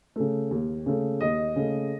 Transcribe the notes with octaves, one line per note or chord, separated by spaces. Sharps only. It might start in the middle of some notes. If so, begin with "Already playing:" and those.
C#3 A3
D#2
C#3 A3
D#2 D#5
C#3 A3